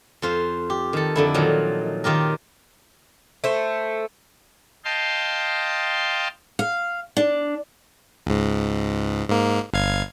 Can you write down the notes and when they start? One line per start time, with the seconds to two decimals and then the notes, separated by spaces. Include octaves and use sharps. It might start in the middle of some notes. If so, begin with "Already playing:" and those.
0.22 F2 F4 C5
0.70 G4
0.93 D#3 A4
1.16 F2 D3 E4
1.34 A#2 D#3 F3 F#3
2.04 D#3 F4 G4 A#4
3.44 A3 C5
4.85 D#5 F5 G5 A5 C6
6.59 F5
7.17 D4
8.26 C#2 G#2
9.29 G#2 A#3
9.74 G1 F5 G#6